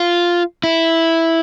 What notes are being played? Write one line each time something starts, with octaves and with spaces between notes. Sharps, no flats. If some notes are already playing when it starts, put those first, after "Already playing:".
Already playing: F4
E4